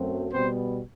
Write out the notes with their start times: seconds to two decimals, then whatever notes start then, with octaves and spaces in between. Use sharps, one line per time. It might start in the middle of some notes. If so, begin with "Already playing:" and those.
Already playing: F#2 F#3 A3 C4
0.32 B2 G3 B3 C4 C5